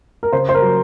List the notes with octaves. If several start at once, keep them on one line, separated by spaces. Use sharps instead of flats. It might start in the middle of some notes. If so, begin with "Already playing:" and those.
A#4
C#3 C5
C5
A#4
F#3